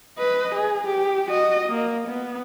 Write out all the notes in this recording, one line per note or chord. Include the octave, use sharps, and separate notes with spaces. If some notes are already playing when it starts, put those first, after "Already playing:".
B4 D#5
G#4
G4
F#4 D#5
A#3
B3